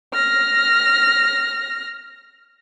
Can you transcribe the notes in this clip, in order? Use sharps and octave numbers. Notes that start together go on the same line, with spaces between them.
F6 A#6